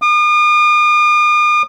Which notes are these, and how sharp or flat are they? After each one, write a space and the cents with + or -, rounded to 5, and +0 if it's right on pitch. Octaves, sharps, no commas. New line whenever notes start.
D#6 -45